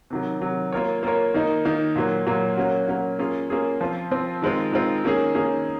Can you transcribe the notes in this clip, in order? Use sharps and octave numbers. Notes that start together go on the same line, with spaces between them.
C3 D#3 F#3
C3 D#3 F#3
A#3 F4 A#4 C#5
A#3 F4 A#4 C#5
D#3 A#3 D#4
D#3 A#3 D#4
A#2 F#3 A#3
A#2 F#3 A#3
F#3 A#3 C#4 F#4
F#3 A#3 C#4 F#4
A#3 C#4 F4 G#4
A#3 C#4 F4 G#4
F3 C4 F4
F3 C4 F4
D#3 G#3 C4 F4
D#3 G#3 C4 F4
D#3 A#3 C#4 G#4
D#3 A#3 C#4 G#4